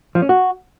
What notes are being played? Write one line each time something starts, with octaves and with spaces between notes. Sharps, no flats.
F3
C#4
F#4